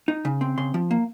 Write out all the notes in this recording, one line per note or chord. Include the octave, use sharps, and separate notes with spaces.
D#4
C#3
C4
C#3 C6
F3
A#3